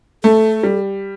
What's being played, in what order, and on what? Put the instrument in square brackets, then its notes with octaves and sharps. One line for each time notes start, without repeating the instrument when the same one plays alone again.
[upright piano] A3 [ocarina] A4
[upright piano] G3